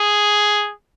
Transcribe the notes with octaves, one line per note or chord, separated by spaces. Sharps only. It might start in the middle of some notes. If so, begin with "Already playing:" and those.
Already playing: G#4